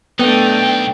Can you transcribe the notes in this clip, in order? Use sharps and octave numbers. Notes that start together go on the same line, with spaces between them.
B1 A3 B3 D4 D#4 G5